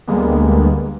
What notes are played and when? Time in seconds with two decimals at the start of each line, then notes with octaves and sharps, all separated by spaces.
0.07 D2 D3 G3 G#3 A#3 B3